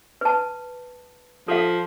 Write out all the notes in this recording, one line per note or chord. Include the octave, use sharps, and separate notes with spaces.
B4 A5
F3 A4 F5